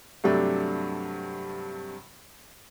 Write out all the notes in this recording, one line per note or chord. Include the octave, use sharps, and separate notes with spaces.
G2 C3 F#3 A3 D4 G4